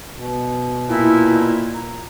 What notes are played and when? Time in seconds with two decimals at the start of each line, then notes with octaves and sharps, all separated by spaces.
0.16 B2
0.89 A#2 E4
1.74 A#5